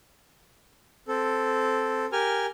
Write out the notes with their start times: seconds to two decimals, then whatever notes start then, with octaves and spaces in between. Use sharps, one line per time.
1.08 C4 A4
2.12 G4 A#4 G#5 F6